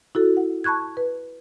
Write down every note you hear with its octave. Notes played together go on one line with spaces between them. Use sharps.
E4 F#4 A4
F#5
A5 B5 C#6 F#6 G#6
B4